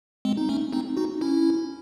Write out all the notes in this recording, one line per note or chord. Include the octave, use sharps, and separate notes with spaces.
G#3 C4
D#4
A3 C#4
C4 D#4
D#4 F#4
C#4 E4